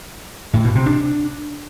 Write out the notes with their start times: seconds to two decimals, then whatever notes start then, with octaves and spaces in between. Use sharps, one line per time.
0.54 A2
0.64 B2
0.75 C3
0.86 D4